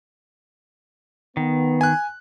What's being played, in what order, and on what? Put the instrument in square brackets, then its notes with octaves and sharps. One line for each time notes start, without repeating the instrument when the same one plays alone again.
[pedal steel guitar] D#3 [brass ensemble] B3
[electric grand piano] G#5 F#6